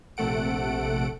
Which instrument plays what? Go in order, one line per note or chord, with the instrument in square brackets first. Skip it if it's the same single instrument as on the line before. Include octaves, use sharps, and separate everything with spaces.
[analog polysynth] A#1 C3 A3 A4 F#5 D7